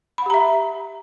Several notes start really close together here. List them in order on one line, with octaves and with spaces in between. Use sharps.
B5 F#5 G4 A#5 E5